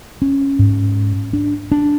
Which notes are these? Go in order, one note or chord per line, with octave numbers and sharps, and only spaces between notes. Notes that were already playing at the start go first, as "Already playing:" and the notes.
C#4
G#2
D4
D4